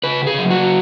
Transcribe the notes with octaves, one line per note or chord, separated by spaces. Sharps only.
C#3 B4
G#4
F#3
F#4